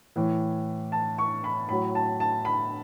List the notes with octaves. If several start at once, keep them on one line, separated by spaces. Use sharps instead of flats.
A2 E3
A5
C#6
B5
A2 F#3 B5
A5
A5
B5